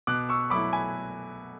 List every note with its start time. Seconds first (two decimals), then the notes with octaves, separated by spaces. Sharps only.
0.07 B2 D6 F#6
0.29 C#6 E6
0.50 F#3 A3 E4 B5 D6
0.73 G#5 B5